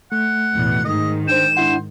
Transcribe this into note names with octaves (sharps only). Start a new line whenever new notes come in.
A3 F#5
A1 E2 B2
G#2 D#3 G#3 D#5
D4 C5 G5 E7
D4 E4 C5 F#5